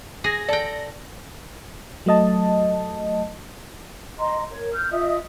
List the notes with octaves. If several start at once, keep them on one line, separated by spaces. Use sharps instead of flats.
G#4 A#6
A4 D5 G5
F#3 A3 D#5 A5
D#5 A#5 C6
A#4 C#5
F6 G6
F4 D#5 E5 D#6